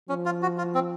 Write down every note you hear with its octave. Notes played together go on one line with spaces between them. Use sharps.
F3 C#4
F4
F#4
F4
C4